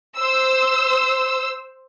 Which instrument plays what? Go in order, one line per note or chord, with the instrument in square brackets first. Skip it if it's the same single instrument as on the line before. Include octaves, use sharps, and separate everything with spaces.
[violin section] C5 E6